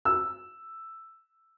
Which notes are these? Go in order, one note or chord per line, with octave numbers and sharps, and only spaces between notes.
E6